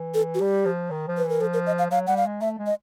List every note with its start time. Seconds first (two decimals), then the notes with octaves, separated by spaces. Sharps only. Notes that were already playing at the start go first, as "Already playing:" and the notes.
Already playing: E3
0.14 A4
0.34 F#4
0.39 G3 G4
0.65 F3
0.91 D#3
1.08 F3
1.17 B4
1.24 E3
1.29 A#4
1.41 F3 A4
1.54 A#4
1.67 D#5
1.79 F5
1.91 F#3 F5
2.07 G3 F#5
2.17 F5
2.25 G#3
2.41 A3 E5
2.59 G#3
2.66 D#5